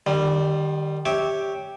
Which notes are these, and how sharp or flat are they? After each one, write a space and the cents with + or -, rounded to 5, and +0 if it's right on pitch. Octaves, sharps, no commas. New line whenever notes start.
D#3 -40 G3 +0
G4 +0 C#5 +0 E5 -20